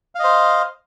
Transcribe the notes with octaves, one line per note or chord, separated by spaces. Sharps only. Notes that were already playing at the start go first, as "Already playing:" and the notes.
C5 D#5 F5